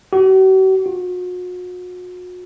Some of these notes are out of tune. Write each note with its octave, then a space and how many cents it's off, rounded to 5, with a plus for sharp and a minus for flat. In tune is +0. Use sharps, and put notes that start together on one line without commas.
F#4 +45
F#4 -40